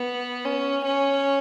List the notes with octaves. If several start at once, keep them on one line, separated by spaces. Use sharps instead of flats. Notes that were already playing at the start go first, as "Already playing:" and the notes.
Already playing: B3
C#4
C#4